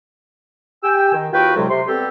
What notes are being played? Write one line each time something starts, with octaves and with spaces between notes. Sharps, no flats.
G4 G5 G#5 E6
D#3
D#2 F4 F#4 B4 G5
D2 A2 C3 F#3 G#3 F4
C3 C6
G3 B3 C4 G4 A4